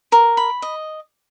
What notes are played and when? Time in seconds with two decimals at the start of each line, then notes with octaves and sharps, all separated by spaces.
0.12 A#4
0.37 B5
0.62 D#5